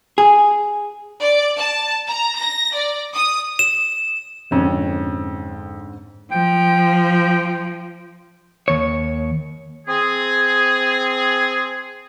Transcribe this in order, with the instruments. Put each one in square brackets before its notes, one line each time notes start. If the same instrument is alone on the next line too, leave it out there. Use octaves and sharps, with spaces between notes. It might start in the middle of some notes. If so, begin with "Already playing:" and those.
[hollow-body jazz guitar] G#4
[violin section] D5
A5
A#5
A#6
D5
D#6
[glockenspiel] E7
[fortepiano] F2 [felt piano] G#2 D3 C4 [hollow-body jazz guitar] C#4
[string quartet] F3 [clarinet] G5
[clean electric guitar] D#2 C#5
[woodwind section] C4 G#4